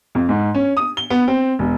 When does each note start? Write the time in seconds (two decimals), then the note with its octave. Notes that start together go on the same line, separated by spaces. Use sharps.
0.15 F2
0.29 G#2
0.55 C#4
0.77 D#6
0.97 G7
1.10 B3
1.28 C4
1.59 E1